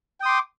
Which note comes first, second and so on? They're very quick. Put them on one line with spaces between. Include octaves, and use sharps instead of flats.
G5 D#6 C6 D6